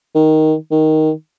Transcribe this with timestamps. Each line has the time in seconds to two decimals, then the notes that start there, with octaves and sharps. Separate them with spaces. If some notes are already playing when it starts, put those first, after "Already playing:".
0.15 D#3
0.71 D#3